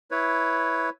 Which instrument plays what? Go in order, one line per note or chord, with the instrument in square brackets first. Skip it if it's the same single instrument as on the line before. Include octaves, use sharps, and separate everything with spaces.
[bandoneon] E4 B4 C#5